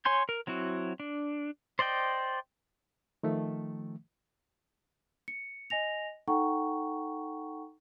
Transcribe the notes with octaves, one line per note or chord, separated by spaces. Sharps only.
C#5 G#5 C6 G6
A#4
F#3 C4 E4 F#4
D4
C5 D5 D#5 G5
D#3 F3 A3
C#7
D#5 G#5 A#6 F7
D#4 A4 F#5 G5 A#5 C#6